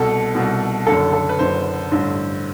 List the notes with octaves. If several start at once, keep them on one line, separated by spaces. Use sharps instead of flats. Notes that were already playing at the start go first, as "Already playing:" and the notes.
Already playing: C2 B2 A4
C2 B2
F#1 F#2 D3 A4
A4
B4
F#1 F#2 D3 C5
A1 G2 D3